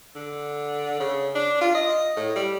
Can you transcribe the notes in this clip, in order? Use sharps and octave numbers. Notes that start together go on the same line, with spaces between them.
D3
C#3
D4
F4
D#5
A2
G3